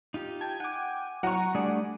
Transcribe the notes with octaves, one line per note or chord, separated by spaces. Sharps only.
D#4 F4 G4
G5 A5 G#6
F#5 G#5 D6
F#3 E4 F#5 A#5 C#6
G3 A3 D4 D5 G#5 D#6